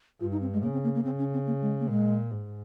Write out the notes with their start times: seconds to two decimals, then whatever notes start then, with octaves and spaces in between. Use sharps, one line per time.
0.20 G2 F4
0.32 D#4
0.41 C4
0.53 G#3
0.63 C#3 A#3
0.73 C4
0.84 A#3
0.95 A#3
1.05 C#3 C4
1.19 C#4
1.33 C4
1.47 A#3
1.62 G#3
1.80 A#3
1.89 A#2 G#3
2.31 G#2